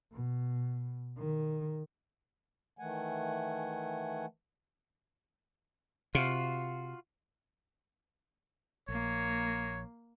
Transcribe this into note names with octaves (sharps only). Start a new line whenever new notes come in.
B2
D#3
D#3 E3 A3 F#5 G#5
C3 F4 F#4 F5
A#1 A#3 C#5